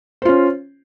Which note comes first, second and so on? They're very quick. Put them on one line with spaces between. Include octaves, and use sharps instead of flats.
C5 F4 C#4